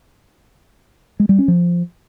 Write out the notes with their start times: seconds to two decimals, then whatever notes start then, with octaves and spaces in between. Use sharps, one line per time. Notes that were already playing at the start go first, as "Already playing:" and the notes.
1.20 G#3
1.29 G3
1.39 C#4
1.48 F3